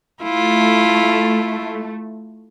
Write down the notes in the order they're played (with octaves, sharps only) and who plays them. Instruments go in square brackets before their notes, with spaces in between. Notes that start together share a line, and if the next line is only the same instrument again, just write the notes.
[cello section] A3 [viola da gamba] E4 F4